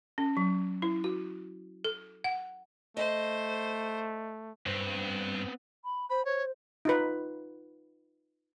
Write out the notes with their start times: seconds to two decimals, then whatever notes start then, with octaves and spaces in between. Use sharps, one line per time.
0.18 C#4
0.37 F#3
0.82 E4
1.04 F#4
1.84 A4
2.24 F#5
2.97 A3 C5 D#5
4.66 G2 B3 C4
5.84 B5
6.10 C5 B5
6.25 C5 C#5
6.85 D#4 F4 B4